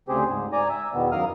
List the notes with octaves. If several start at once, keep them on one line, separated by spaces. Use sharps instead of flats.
D2 C#3 C4 G4 G#4 C5
G#2
D5 G#5 A#5
E5
E2 B2 D#3 B3
F#2 A#4 F5 D#6 F6